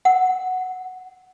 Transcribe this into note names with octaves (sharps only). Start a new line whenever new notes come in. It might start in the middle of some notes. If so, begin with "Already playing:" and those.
F#5